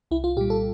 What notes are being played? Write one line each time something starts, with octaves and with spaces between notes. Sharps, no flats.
C2 E4
F4
A#2 G3 G4
A4